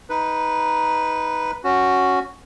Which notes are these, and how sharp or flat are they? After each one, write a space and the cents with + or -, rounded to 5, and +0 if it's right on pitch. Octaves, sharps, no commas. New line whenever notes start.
D#4 +10 B4 +0
C#4 +0 F#4 +0